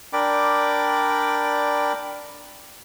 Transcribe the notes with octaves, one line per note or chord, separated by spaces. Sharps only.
D4 A#4 D5 G5 B5 D6